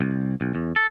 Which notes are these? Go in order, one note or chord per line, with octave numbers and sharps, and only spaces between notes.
C2
B1
E2
A4